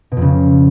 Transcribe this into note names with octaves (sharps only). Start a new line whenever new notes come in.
B2
F2
C#3